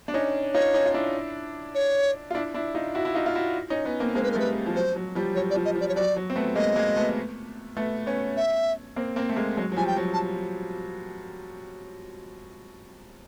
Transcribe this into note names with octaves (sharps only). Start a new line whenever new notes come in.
D4
C#4 D#4
D#4 F4 C#5
C#4 D#4
F4
D4 E4
C#5
F4
D4 E4
D4 E4
D#4 F4
E4 F#4
E4
D#4 F4
F4
E4 F#4
C#4 D#4
B3 C#4
A#3 C4
G#3 A#3 C5
B4
A#4
G3 A3
B4
F3
F#3 C5
F#3
F3 G3
F#3 C#5
D5
F3
D#5
F3
D5
C#5
F#3 D5
F#3
C4
A3 B3
G#3 A#3 D#5
G#3 A#3
A3 B3
A3 B3
B3 C#4
E5
A#3 C4
A#3 C4
A3
G#3 A#3
F#3 G#3
F#3
F3 G3 G#5
G5
F#3
A5